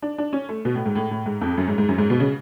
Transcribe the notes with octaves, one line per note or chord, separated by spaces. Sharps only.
D4
D4
C#4
A3
B2
A2
G#2
A2
A2
G#2
F2
F#2
G#2
G#2
F#2
G#2
B2
C#3